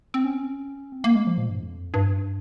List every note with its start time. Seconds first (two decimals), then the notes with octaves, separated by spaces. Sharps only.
0.14 C4
0.24 C#4
0.92 C4
1.04 A#3
1.15 G#3
1.27 F3
1.38 A#2
1.49 G2
1.61 F2
1.94 G2